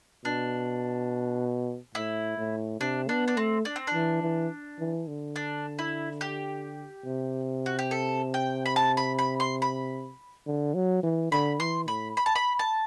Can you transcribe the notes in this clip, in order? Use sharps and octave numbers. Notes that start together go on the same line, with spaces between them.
B2 D4
A2 E4
A2
C3 D4
B3 D4
D4
A3 C4
D4
C4
D4
E3
E3
E3
D3
D4
E4
G4
C3
F#4
G4
A4
G5
B5
A5
B5
B5
C6
B5
D3
F#3
E3
D3 B5
E3 C6
A2 B5
B5
A5
B5
A5